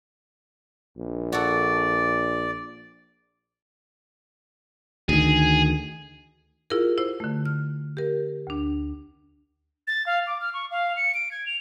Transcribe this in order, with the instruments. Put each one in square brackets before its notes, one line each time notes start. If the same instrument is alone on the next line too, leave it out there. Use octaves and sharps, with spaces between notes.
[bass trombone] A#1
[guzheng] F#4 A4 [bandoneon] D5
[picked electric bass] D2 D#3 [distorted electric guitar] G#4
[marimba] E4 F4 G4 G#4 A#4
E4 C5
D3 A3
F6
G4 A#4
D2 D4
[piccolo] A6
F5
D6
F6
C#6
F5
C#7
D7
G#6
F7